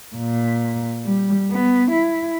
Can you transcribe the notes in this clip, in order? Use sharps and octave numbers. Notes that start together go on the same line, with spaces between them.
A#2
G3
B3
E4